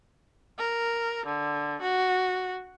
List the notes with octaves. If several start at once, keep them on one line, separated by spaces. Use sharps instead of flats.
A#4
D3
F#4